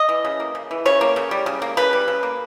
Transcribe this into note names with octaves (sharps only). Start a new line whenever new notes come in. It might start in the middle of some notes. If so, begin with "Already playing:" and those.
Already playing: D#5
E3
C#3
A#3
C#3
E3
C#3 C#5
A#3
C#3
G3
C#3
A#3
C#3 B4
G3
C#3
A#3